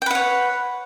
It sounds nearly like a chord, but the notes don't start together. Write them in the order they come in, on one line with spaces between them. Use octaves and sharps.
G5 B4 F#5 C#5